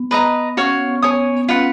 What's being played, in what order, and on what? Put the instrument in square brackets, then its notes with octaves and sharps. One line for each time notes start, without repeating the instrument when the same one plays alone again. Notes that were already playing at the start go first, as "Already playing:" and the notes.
Already playing: [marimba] B3
[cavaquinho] B4 D#5 A#5
[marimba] C#4 [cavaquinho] F#4 C#5 F5
[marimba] B3
B3
[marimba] B3 [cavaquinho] C#5 G#5 D#6
[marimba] B3
B3
[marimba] C#4 [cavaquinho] F4 B4 F#5